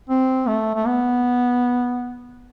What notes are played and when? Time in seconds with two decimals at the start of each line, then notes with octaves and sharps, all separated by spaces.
0.09 C4
0.48 A3
0.75 A3
0.87 B3